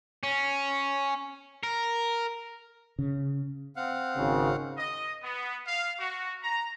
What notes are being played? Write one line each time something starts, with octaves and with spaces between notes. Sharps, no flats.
C#4
A#4
C#3
C4 F5 F#5
G#1 C#3
D#5
B3
F5
F#4
A#5